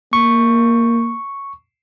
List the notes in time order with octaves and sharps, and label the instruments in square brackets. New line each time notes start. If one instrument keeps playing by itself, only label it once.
[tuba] A#3 [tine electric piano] C#6